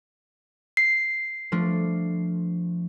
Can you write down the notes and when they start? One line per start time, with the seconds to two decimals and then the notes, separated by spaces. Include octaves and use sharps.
0.77 C7
1.52 F3 A3 D4